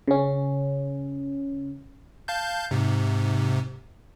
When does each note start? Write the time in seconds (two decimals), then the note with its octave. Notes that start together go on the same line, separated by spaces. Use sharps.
0.08 C#3 C#4
2.28 F5 A5 G6
2.71 G#2 C3